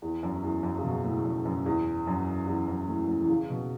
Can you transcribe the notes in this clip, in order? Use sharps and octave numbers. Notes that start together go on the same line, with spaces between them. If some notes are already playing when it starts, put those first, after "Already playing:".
E2
F#2
E2
F#2
C#3
B2
A2
F#2
F#2
E2
F#2
E2
F#2
A2
A2
E3
C#3
B2